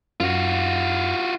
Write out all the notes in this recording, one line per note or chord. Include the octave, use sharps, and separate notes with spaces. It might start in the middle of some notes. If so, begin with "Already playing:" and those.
F#2 F4 F#4